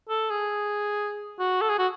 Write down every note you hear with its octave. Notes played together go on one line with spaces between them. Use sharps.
A4
G#4
F#4
A4
G#4
F#4